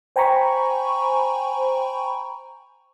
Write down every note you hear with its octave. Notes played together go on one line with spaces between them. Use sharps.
C5 G5 G#5 A#5 B5 C#6